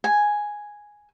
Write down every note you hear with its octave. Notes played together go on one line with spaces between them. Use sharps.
G#5